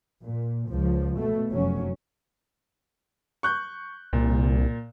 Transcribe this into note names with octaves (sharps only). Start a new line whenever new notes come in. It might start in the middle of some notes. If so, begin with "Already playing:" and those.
A#2
C#2 F3
B2 A3
F1 F#2 F#3 C#4
C#6 F#6 G6
C2 A#2